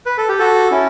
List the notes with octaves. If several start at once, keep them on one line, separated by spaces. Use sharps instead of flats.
B4
A4
G4
F#4 A4
C#4 E4